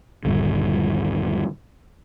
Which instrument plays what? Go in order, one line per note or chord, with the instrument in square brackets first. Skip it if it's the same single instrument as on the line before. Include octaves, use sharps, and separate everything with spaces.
[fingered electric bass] D#1 G2 D3